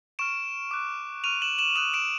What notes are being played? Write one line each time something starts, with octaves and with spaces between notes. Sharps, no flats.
C#6 F6 D7 E7
D6 F#6
C#6 F6 D#7 F7
E7 F#7
E7 F#7
D#6 F#6 D#7 F7
D7 E7